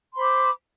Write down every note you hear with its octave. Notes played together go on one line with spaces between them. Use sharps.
C5 B5 C6 D6